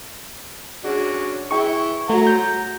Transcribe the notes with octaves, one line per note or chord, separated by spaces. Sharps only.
C#4 D4 F#4 G#4
E3 E4 G#4 G5 C#6
A3 F#4 F#5 A#5 C6
G6